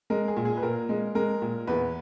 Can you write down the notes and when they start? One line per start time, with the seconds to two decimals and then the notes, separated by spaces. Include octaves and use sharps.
0.10 G#3 A#4
0.28 G#4
0.36 A#2
0.45 G#4
0.57 B4
0.63 A#2 A#4
0.89 G#3
1.15 G#3 A#4
1.42 A#2
1.67 E2 B4